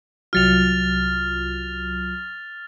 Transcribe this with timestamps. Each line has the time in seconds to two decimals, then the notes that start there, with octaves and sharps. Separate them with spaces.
0.33 C2 F#3 F4 F6 A6 F7